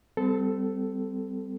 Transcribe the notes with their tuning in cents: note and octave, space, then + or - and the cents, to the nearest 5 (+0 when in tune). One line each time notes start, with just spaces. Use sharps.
G3 +0 C4 -30 A4 +0